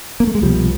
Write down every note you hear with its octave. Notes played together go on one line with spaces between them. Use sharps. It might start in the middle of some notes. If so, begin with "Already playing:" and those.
A#3
A3
G#3
C2 B2 F3 G3